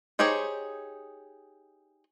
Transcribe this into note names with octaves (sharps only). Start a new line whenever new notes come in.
D#4 G4 G#4 C5 C#5